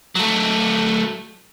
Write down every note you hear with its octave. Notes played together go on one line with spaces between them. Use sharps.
F#3 A3